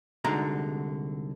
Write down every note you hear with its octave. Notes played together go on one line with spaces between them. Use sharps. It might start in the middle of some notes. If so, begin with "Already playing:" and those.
C2 D3 G#3 D#4 F#4 A#5